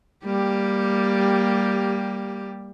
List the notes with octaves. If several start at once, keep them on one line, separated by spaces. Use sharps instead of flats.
G3 A#3 G4